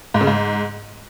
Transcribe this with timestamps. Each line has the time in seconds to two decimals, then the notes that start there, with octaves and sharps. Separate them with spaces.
0.14 G#2
0.21 C#3
0.27 G#2